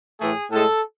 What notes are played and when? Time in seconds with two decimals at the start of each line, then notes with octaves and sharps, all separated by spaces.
0.20 A2 E3 A3 G#4
0.52 A2 G#3 A4